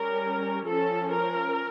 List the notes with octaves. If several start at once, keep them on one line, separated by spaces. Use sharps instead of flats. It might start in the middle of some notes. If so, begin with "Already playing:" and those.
Already playing: G3 C#4 A#4
F3 C#4 A4
A#4